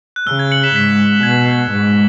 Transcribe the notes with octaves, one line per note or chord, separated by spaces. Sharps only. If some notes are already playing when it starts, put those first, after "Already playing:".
F#6
C#3 E6
G#6
C#7 F#7
B6 E7
G#2 B6
B2 G#6
G#2